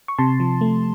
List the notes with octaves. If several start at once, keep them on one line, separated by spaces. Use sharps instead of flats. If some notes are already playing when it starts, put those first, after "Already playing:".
C#6
C3 A5 C6
F3
A3